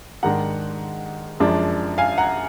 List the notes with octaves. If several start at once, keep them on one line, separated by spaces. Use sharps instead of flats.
G#2 D#3 G#3 D4 F#5 A#5
F#2 F3 G#3 D4
F5 G#5
F#5 A#5